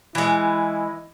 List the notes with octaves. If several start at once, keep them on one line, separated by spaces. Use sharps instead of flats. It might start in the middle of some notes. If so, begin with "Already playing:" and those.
E3 G#3 E4